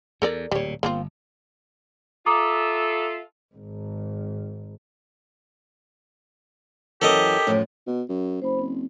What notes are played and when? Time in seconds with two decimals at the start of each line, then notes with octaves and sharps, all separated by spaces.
0.22 E2 A4 A#4 D5
0.51 D1 A#2 G3 C#5
0.83 G1 A#3 C4 F4
2.26 F4 A4 E5 A#5 D6 D#6
3.55 G#1
7.02 F#2 E3 G4 A4 A#4 D#5
7.47 F#2 A2 F3
7.87 B2
8.09 F#2
8.42 F#1 C5 B5
8.59 C4